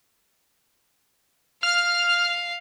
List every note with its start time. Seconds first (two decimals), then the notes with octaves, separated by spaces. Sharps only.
1.63 F5 F6